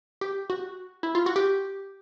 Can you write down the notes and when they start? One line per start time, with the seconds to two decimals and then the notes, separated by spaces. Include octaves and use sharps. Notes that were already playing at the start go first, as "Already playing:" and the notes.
0.21 G4
0.50 F#4
1.03 E4
1.15 F4
1.26 F#4
1.36 G4